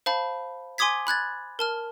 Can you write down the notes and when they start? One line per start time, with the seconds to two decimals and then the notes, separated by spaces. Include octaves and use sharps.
0.06 C5 F5 A5 B5
0.78 G#5 C6 D6 D#6 G#6 B6
1.07 B5 F#6 G#6 A6
1.59 A#4 A5 F6